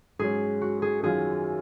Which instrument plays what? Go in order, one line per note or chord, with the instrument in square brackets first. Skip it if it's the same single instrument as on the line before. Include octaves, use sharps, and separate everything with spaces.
[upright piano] G#2 F#3 C#4 [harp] G#4
[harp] F#4
G#4
[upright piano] F#2 D#3 F#3 C#4 F4 [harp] G#4